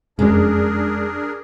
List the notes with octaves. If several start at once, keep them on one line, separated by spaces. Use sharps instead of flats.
F1 F#2 G#3 D4 G#4 A#4